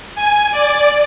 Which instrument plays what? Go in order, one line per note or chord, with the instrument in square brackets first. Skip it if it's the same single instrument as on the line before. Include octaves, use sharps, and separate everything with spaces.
[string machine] G#5
D5